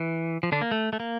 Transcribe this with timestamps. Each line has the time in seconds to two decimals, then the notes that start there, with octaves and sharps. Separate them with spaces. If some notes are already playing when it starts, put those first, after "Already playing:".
Already playing: E3
0.43 F3
0.52 D3 D4
0.61 A#3
0.71 A3
0.93 A3
1.00 A#3